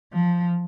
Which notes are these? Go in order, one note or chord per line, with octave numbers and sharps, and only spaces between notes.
F3